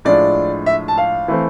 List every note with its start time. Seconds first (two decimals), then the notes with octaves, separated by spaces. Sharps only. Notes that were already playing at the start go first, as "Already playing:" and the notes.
0.05 A2 F3 G#3 D4 F4 D5
0.66 E5
0.88 A5
0.98 F5
1.28 E3 A3 C4